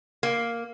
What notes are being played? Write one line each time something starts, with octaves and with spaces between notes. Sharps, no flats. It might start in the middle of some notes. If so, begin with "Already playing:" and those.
A#3